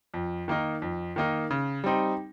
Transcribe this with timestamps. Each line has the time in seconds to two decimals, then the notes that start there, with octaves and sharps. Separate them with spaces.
0.14 F2
0.48 D#3 A#3 D#4
0.82 F2
1.16 D#3 A#3 D#4
1.51 C#3
1.84 G3 C4 D#4